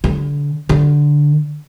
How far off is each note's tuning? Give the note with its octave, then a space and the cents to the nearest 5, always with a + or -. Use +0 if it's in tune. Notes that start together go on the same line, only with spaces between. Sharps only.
D3 -25
D3 +0